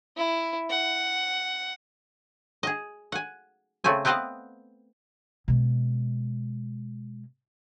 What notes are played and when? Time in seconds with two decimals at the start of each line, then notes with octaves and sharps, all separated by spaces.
0.17 E4
0.70 F#5
2.63 G#4 D#5
3.12 F#5 G#5
3.84 C#3 A3 C4 G#5
4.05 B3 C4 B4 D#5 F5 F#5
5.48 B2 G#3